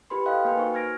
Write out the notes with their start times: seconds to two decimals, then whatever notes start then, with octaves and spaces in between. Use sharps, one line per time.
0.10 E4 G4 B4 B5 C6
0.26 A4 D#5 F5 G5 F#6
0.45 A#3 B4 G#5
0.57 D#4 F#4 C5 C#6
0.74 F6 G#6 A#6 D7